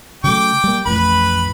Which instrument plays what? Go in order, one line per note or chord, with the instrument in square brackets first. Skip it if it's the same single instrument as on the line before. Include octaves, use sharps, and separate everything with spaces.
[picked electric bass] C#3 F#3 A3 [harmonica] G5 D6
[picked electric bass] G3 A#3
[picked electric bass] A1 F2 A2 [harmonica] B4 B5